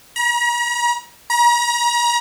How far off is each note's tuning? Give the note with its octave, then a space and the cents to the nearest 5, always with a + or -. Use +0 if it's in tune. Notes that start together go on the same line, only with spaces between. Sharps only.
A#5 +45
A#5 +40